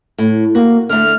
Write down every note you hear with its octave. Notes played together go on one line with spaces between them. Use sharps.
A2
A#3 F#4
D3 A3 F6